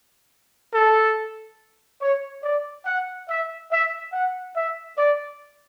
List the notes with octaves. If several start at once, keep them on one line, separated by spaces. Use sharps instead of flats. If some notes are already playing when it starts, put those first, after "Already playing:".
A4
C#5
D5
F#5
E5
E5
F#5
E5
D5